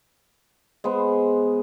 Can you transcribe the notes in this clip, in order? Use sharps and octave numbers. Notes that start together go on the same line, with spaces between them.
G#3 B3 C5